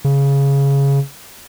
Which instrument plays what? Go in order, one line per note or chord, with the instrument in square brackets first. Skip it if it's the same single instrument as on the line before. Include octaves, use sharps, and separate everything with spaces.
[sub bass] C#3